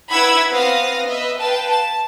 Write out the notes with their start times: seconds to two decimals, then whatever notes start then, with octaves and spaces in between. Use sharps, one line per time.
0.10 E4 B4 F#5 B5 E6 G#6
0.52 B3 C4 F5 D#6 A#6
1.08 B4 D#5 E5
1.39 B4 F5 G5 A5
1.70 A5